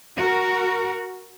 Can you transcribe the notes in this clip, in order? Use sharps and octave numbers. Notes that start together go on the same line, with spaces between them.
F#4 A#4